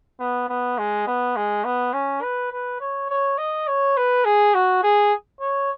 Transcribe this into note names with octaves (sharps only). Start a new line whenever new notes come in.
B3
B3
G#3
B3
G#3
B3
C#4
B4
B4
C#5
C#5
D#5
C#5
B4
G#4
F#4
G#4
C#5